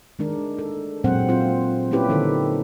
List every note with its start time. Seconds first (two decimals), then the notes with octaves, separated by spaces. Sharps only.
0.19 D#3 G#3 D4 A#4
0.59 A4
1.04 A#2 F#3 G#3 C4 C5 F#5
1.29 C4 F4 C5
1.91 A#3 C#4 E4 G4 B4
2.09 D3 D#3 D#4 A4